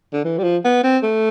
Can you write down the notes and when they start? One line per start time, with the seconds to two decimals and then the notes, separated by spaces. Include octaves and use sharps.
0.13 D3
0.24 E3
0.38 G3
0.43 F3
0.64 B3
0.84 C4
1.03 A3